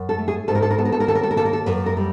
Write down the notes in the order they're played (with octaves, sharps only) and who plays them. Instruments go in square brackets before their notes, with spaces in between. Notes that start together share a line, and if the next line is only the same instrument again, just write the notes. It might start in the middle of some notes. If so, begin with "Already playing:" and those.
Already playing: [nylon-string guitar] F#2
A4
A3
G#4
G#2 A4
A#4
A4
A#4
B3 A4
A#4
A4
A#4
D#2 A4
A#4
A4
A#4
A#3 A4
A#4
A4
F#2 B4
A#4
G3